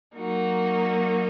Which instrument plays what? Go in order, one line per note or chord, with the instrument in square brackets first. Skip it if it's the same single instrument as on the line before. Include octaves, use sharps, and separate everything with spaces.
[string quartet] F#3 A#3 D#4 F#4